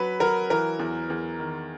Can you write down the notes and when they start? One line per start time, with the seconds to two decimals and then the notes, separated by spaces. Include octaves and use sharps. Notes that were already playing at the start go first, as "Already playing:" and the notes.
Already playing: F#3 B4
0.20 F#3 A#4
0.50 E3 A#4
0.79 E2
1.10 E2
1.39 D#3